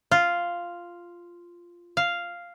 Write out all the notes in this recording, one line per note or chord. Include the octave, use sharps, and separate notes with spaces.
F4
F5